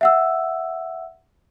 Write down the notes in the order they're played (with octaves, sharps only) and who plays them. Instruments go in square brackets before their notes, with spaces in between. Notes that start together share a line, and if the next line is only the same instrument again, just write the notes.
[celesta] E5 F#5 E6